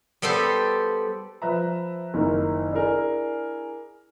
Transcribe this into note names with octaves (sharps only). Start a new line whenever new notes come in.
G3 B3 A4 C5
F3 B4 E5 A#5
F#1 D#3 E4 A#4
D4 E4 G#4 A#4